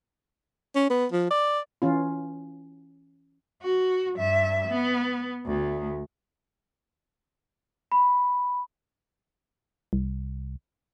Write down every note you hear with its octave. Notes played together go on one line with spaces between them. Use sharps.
C#4
B3
F3
D5
E3 C#4 F4
F#4
G2 E5
B3
D2
B5
C2